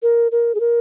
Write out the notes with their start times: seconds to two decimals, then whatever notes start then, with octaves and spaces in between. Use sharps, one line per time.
0.03 A#4
0.32 A#4
0.55 G#4
0.60 A#4